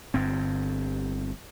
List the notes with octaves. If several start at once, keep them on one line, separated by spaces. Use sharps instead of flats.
G1 G2 C4